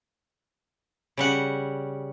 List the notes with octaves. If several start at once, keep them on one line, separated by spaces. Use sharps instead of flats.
C#3 G3 F#5